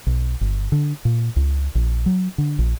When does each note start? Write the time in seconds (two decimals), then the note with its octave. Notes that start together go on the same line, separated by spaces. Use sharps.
0.07 B1
0.41 G1
0.72 D3
1.05 A#2
1.36 C#2
1.75 A#1
2.06 F#3
2.38 D3
2.59 A#1